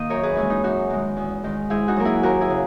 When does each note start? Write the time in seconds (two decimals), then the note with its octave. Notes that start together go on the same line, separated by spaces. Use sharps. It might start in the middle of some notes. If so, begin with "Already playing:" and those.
Already playing: D#3 A#3 D#5
0.10 F#2 A#4 C#5
0.23 G#4 B4
0.35 E3 G#3 C#4 E4
0.50 D#4
0.64 F#2 D#4 F#4
0.90 D#3 G#3
1.16 E2
1.44 D#3 G#3
1.70 G#2 E4 G#4
1.88 D#4 F#4
1.96 F#3 A#3 A#4
2.05 E4 G#4
2.23 D#2 F#4 A#4
2.41 E4 G#4
2.50 C#3